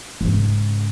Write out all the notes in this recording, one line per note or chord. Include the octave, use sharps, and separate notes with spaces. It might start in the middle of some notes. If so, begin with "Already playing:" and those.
G#2 C#3